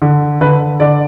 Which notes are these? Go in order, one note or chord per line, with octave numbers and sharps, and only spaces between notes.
D3
D3 B4
D3 D5